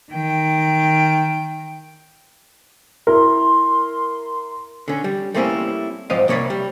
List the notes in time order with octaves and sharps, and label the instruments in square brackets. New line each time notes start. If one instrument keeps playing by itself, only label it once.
[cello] D#3 G5
[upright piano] E4 A#4 [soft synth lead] C6
[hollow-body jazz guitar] D3 C#4
G3
G3 A3 A#3 C4 C#4 E4
G#2 F3 C4 D5 D#5 F5
C2 A#3 C#5 D5 B5
G3